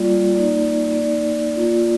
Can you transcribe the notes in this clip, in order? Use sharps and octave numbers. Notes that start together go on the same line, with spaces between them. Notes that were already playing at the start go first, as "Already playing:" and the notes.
Already playing: G3 A#3 F4 D5
A#3 D#4 D5
A#3 D#4 D5
A#3 F4